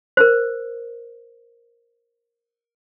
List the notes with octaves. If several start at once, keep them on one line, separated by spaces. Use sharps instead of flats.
A#4 C5